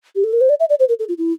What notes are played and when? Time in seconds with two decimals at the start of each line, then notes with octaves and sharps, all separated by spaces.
0.15 G4
0.24 A4
0.33 A#4
0.41 C5
0.49 D5
0.60 E5
0.70 D5
0.80 C5
0.89 A#4
0.99 A4
1.09 F4
1.18 E4